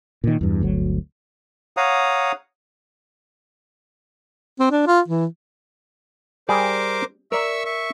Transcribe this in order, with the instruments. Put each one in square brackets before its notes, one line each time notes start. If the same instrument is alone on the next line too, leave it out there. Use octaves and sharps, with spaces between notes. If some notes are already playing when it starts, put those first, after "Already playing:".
[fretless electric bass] A#2 D#3
E2 G2
G1 D2 F#3
[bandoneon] C#5 F5 F#5 A#5 D#6
[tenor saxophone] C4
D4
F4
E3
[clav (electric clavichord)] G3 G#4 [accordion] A#4 C5 D6
[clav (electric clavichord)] A#4 D5 [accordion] E5 C#6 E6
[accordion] E5 C#6